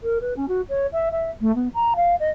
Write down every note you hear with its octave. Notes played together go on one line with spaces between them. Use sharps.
A#4
B4
C#4
F#4
C#5
E5
E5
A3
B3
A#5
F5
D#5